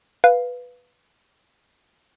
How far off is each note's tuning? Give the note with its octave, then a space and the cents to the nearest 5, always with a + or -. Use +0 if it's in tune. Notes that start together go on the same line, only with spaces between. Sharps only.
B4 +0 F5 +0